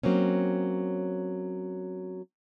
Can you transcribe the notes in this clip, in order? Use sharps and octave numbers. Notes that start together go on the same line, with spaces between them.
F#3 A#3 C4 C#4